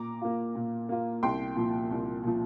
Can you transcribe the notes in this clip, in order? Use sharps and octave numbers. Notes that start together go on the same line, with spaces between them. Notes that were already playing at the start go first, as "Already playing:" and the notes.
Already playing: A#2 A#5 D6
A#3 F4
A#2
A#3 F4
C2 G5 C6
A#2 F3
C2
A#2 F3